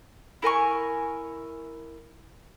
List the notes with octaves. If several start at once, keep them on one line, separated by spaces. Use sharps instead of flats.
E4 A#4 G#5 C#6